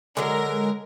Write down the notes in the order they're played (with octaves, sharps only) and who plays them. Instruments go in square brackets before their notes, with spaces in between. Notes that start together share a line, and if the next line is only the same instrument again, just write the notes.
[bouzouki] D3 F#3 [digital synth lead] G#3 [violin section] A#4